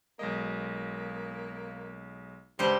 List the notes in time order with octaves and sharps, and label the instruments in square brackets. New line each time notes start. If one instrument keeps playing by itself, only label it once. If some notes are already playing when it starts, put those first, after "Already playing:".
[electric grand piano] B1 G#3 D#5 [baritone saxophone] A#3
[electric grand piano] C#2 [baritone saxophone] G2 [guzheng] G3 C5